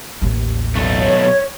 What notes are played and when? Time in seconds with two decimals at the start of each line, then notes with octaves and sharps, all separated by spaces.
0.22 A1 D#2
0.76 B1 A3
1.02 C#5